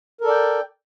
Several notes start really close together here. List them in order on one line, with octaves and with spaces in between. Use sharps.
A#4 A4 D5 G5